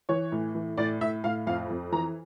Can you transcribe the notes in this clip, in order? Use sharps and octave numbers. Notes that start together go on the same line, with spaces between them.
E3 C#5
A2
E3
A2 D5
A2 E5
A2 F5
F2 F5
F2
E3 A#5